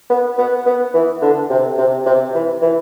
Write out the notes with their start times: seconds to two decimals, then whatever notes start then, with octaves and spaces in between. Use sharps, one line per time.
0.10 B3
0.38 B3
0.66 B3
0.94 E3
1.21 D3
1.50 C3
1.78 C3
2.06 C3
2.34 E3
2.61 E3